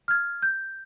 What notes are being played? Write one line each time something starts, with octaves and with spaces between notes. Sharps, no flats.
F6 G#6
G6